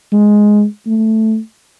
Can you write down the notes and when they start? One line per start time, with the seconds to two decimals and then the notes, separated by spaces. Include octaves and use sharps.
0.13 G#3
0.87 A3